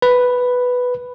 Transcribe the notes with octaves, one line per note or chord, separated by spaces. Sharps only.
B4